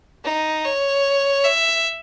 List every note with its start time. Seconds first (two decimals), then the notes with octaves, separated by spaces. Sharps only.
0.24 D#4
0.65 C#5
1.44 E5